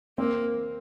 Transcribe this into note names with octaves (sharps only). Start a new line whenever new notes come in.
A#3 C4